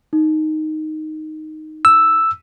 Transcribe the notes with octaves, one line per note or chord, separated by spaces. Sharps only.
D#4
E6